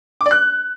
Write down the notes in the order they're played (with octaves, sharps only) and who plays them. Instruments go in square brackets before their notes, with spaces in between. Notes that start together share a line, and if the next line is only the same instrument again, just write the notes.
[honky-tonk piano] D6
D5
F#6